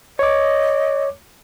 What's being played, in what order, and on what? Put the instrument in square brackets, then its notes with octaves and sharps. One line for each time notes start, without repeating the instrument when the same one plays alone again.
[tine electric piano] C#5 D6 [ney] D#5